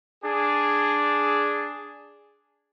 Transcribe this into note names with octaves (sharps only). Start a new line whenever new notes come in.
D4 G#4